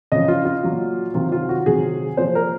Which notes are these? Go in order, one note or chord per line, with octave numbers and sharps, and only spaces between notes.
C#3 F3 D#5
F4
F4
A#2 F#3
C3 D#3 F#3 F4
F4
F#4
C3 D#3 F#3 G#4
A#2 F3 C5
A#4